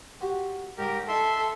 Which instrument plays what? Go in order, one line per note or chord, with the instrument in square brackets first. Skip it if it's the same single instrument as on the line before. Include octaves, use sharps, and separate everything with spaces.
[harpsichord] F#4 G4 C5
[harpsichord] G#2 C#4 D#6 [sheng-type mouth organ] G4 A#4
[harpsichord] D#4 [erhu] A4 [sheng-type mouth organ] E5 C6